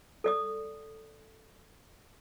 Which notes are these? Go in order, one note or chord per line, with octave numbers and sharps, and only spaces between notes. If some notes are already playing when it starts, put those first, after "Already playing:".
A4 D5 D#6